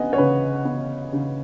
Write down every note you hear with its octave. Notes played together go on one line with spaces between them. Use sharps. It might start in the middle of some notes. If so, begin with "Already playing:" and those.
Already playing: B3 D#5 F#5 G#5
C#5
C#3 B4
B3
C#3